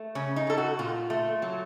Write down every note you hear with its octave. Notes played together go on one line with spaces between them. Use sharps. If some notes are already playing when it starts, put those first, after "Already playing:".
Already playing: A3
C#3 C#4
D#4
C#3 A4
F#4
A#2 F4
A3
F#3